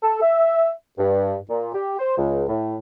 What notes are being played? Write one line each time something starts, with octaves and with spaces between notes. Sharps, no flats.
A4
E5
G2
A#2
G4
C5
C#2
A2